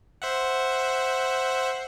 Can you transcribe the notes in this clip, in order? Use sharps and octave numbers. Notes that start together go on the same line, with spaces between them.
C5 E5 F#5